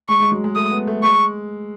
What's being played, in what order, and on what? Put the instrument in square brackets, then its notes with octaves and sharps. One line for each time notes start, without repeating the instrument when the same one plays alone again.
[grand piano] G#3 [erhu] C#6
[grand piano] G#3
F#3
G#3
[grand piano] A3 [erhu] D#6
[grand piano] B3
A3
[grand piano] G#3 [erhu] C#6